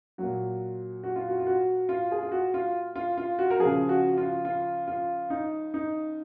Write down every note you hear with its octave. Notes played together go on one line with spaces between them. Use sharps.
A#2 F#3 F#4
F#4
F4
F#4
F4
F#4
F4
G#4
F4
F#4
F4
F4
F4
F#4
A#4
F3 G#4
C#3
F#4
F4
F4
F4
D#4
D#4